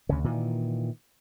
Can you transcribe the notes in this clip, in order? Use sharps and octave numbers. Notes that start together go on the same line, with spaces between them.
D2 C#3
A#2 D#3 E3